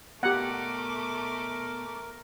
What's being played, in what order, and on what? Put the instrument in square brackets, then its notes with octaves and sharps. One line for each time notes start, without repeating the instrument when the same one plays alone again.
[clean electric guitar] B2 [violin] A3 D6 [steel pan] G4 F#5 [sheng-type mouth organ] A#4